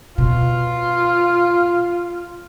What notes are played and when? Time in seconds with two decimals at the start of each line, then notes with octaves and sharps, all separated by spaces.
0.18 B2 F4